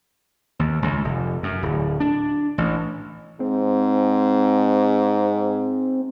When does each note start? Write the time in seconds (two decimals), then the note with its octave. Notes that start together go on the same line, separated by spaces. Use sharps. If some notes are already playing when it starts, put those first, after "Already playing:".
0.59 D#2
0.82 C#2
1.04 F1
1.43 F#2
1.62 D1
2.00 D4
2.58 A1
3.40 G#2 C4